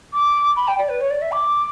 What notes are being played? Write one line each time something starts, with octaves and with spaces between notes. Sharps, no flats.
D6
B5
G5
D5
B4
C#5
D5
E5
D6